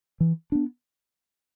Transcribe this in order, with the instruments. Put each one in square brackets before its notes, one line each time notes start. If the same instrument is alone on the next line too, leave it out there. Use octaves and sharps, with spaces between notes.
[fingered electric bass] E3
B3 D4